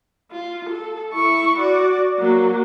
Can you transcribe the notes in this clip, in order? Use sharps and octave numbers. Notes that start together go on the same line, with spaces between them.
F4
A4
E4 C#6
F#4 D5
F#3 A#3